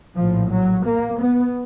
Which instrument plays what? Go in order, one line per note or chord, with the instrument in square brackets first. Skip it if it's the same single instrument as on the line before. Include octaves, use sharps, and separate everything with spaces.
[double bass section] A#1 A2 F3
F#3
A#3
B3